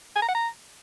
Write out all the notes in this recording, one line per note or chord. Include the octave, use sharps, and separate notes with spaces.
G#5
A#5
F#5
A#5